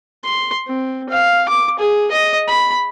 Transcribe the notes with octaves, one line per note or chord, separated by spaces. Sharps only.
C6
C4
F5
D6
G#4
D#5
B5